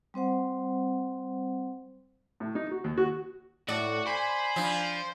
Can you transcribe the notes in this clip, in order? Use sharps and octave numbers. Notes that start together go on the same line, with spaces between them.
G3 C4 C5 F#5
A2
D#4
F#4
D#2
F#4
A2 F#4 D5
C5 G#5 B5
F3 D4